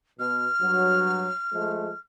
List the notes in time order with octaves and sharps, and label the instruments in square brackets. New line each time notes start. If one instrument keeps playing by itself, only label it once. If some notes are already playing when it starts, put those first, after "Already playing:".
[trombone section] B2 [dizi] F6
[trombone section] G2 F#3
F3 G#3 A3